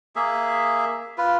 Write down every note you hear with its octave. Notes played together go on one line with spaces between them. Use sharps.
A#3 G#4 E5
F4 B4